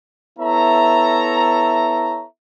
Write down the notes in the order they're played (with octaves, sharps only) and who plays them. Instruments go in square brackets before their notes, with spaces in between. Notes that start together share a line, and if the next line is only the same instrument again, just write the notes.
[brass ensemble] B3 E4 A4 C#5 E5 A#5